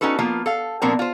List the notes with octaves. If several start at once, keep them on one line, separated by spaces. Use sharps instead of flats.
C#4 D#4 F#4 A4 B4
F3 A#3 B3 F4
A4 F5
A#2 F3 B3 C4 D4 A#4
F4 C5